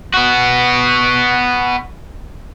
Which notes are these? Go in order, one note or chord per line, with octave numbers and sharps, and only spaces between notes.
B3 F#4